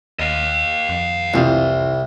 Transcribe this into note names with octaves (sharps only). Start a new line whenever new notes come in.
D#2 D#5 F5
F2
C2 E3 C4 F4